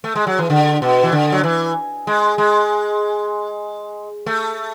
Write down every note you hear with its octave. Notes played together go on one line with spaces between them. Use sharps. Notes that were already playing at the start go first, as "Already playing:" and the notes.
A3
G#3
F#3
E3
D3
B2
E3
D3
F#3
E3
G#3
G#3
A3